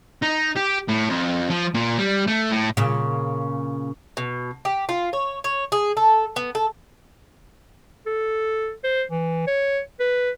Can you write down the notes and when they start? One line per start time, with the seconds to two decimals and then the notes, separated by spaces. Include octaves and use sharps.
0.23 D#4
0.56 G4
0.89 A2
1.10 F2
1.50 F3
1.74 A#2
1.98 G3
2.27 A3
2.50 A2
2.77 A#2 C#3
4.17 B2
4.65 G4
4.89 F4
5.13 C#5
5.44 C#5
5.72 G#4
5.97 A4
6.36 B3
6.55 A4
8.06 A4
8.84 C5
9.11 E3
9.47 C#5
10.00 B4